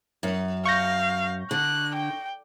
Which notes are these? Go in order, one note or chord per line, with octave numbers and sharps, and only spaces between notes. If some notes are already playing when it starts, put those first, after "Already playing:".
F#2
F5 C#6 G6 A#6
D3 F#6
G5